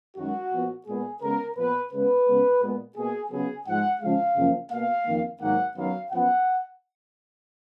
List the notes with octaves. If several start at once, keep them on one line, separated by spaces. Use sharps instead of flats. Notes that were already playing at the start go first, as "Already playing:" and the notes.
F#2 D#3 G#3 F#4
A#2 F3 B3
A#2 G#3 B3 G#4
C#3 G#3 B3 A#4
A#2 F3 B3 B4
C#3 G#3 B3 B4
C#3 G#3 B3
A#2 G#3 B3
B2 A#3 G#4
C#3 F#3 B3 G#4
G#2 F3 G#3 F#5
C#3 F3 G#3 F5
F#2 C#3 F3 A#3
B2 A#3 F5
F2 D#3 A#3
G#2 D#3 F#3 A#3 F#5
F#2 D#3 F#3 B3 F5
F#2 F3 B3 F#5